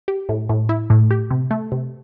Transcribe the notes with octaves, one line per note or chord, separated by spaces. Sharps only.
G4
A2
A2
E4
A2
G4
C3
A3
C3